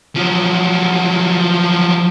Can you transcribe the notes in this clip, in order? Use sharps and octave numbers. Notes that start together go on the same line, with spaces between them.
F3 F#3